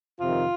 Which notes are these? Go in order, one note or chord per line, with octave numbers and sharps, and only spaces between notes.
F2 C3 D#3 F4